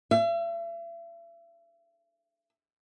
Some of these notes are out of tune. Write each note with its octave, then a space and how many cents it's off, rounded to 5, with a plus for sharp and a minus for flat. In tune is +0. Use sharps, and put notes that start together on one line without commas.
E5 +40